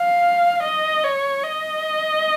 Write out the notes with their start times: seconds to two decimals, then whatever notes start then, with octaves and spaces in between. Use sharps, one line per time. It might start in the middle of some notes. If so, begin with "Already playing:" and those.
Already playing: F5
0.63 D#5
1.04 C#5
1.44 D#5